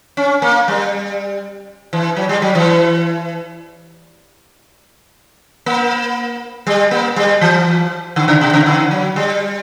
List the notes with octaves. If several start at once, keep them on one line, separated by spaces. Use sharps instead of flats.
C#4
A#3
G3
E3
F#3
G3
F#3
E3
A#3
G3
A#3
G3
E3
D3
C#3
B2
C#3
D3
F#3
G3